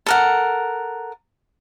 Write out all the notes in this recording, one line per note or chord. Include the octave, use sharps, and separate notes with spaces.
A4 A#4 F#5